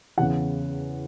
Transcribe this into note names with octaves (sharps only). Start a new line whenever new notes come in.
E2 C#3 E3 F#5